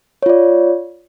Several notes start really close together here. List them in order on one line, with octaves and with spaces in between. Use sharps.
C#5 F4 D5